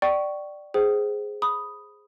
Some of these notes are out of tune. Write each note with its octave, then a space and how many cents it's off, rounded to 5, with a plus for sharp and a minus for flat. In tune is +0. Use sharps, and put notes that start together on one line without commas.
D5 +10 G5 -35 C#6 +0
G#4 +0 C5 +0 G5 -40
B5 +0 D#6 +0